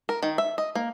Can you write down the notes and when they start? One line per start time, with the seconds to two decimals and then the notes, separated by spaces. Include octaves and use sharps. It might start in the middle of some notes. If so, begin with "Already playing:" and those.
0.09 A#4
0.23 D#3
0.38 E5
0.58 D#5
0.75 A#3